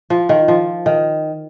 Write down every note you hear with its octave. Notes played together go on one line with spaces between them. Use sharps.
F3
D#3
F3
D#3